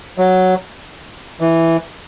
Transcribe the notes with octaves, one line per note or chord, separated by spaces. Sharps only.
F#3
E3